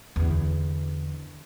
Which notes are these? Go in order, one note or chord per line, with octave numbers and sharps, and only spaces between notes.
E2 D3